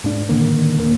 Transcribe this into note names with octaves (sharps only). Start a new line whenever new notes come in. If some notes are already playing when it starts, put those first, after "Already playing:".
G#2 D4
A2 D3 D#3 A#3
D#1 D#2 A#3